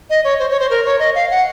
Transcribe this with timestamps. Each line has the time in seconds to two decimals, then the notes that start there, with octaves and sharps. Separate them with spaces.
0.10 D#5
0.24 C#5
0.39 C5
0.50 C#5
0.60 C5
0.70 A#4
0.86 C#5
0.99 D#5
1.15 F5
1.31 F#5